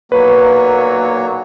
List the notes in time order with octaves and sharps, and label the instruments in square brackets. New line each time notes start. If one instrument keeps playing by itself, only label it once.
[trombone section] B1 A#2 F#3 [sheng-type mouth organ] A#3 C#5 [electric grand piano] B4